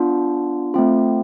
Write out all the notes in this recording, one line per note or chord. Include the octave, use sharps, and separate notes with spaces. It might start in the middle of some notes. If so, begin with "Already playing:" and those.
Already playing: B3 D4 F4
A3 C4 F4